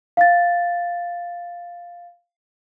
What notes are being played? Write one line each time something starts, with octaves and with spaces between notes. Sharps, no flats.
F5 A6